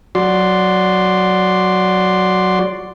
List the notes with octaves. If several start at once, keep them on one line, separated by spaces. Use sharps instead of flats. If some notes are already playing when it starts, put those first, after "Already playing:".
F#3 F#4 D5 C6